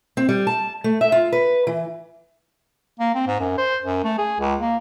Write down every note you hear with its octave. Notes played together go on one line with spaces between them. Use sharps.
C4
G3
A5
A3
E5
F4
B4
E3
A#3
C4
G#2
F#2
C5
F#2
A3
G#4
C#2
A#3